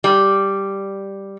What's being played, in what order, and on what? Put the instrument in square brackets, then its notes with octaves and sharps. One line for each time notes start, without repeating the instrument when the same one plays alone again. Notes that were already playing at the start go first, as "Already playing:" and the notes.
[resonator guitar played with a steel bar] G3